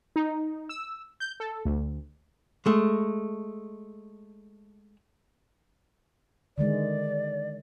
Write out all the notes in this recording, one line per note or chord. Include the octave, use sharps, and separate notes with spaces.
D#4
E6
G6
A4
D2
G#3 A3
D3 D#3 G#3 D5